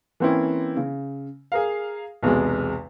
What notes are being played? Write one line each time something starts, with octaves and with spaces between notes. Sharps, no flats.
E3 A#3 C4 C#4 E4
C#3
G#4 A#4 F5
B1 E2 C3 F#3 G#3